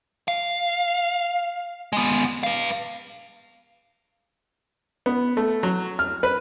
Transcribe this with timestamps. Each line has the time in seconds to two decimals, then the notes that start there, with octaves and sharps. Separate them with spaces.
0.28 F5
1.93 G#3 B3
2.43 B4 F5
5.06 B3
5.37 A3
5.63 F#3
5.99 F6
6.23 B4